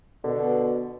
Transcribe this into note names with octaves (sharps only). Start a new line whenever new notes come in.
B2 D3